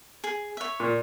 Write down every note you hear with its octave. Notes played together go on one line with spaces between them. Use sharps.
G#4
C#5 E5
A#2